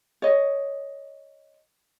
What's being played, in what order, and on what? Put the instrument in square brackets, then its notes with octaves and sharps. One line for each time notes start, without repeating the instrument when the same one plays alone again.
[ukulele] C#5 D#5